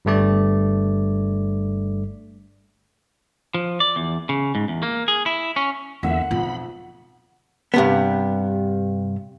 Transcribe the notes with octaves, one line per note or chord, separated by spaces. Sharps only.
G1 G2 A3 D5
F3
D5
E2
C#3
G#2
E2
A#3
G#4
E4
C#4
E2 D3 A#3 B3 E5 F#5
B1 F2 F4 B5
G2 C3 B3